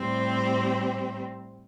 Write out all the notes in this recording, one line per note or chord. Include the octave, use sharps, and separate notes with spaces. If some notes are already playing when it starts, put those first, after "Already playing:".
Already playing: A2 G3 C4 G4 C5